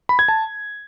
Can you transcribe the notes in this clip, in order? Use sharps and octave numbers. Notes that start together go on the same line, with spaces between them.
B5
G#6
A5